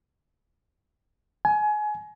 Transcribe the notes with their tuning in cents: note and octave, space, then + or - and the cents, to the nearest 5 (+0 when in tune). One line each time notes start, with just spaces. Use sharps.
G#5 +25